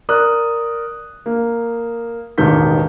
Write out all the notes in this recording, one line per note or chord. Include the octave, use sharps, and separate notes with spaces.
A#4 D5 D#6 F#6
A#3
E1 A1 D#2 D#3 G6 B6